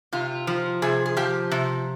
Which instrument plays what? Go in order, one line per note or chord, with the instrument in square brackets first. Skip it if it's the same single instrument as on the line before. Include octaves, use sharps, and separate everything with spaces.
[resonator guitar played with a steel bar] C3 F4
F3
C3 G#4
G#4
F3 G4
C3